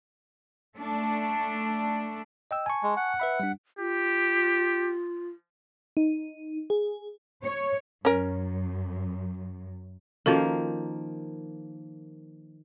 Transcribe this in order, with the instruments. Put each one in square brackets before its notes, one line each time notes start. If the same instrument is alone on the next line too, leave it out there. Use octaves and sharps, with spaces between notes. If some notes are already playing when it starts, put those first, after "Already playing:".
[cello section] A3 D4
[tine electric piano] D#5 G5 E6
G#5 A5 C#6
[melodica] G#3
F#5
[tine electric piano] B4 E5 B5
G3 D4
[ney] F4 [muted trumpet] G4
[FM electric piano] D#4
G#4
[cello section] C#5
[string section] F#2 [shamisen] C#4 A#4
[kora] D#3 F3 A#3 [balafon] C#4 F#4 A4